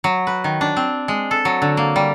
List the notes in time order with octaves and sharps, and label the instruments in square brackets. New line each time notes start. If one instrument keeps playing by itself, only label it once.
[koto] F#3
B4
D#3
D4
C4
G#3
A4
F#3
D3
A#3
G3